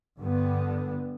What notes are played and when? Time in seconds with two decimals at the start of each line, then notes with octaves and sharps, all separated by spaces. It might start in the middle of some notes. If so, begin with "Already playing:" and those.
0.19 G2 D3 G3 B3